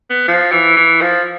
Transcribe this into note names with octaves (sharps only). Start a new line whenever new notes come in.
B3
F3
E3
E3
F3